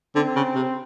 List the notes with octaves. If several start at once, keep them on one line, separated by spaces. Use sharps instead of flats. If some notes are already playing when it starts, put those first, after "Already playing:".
D3 C4
C#3
C3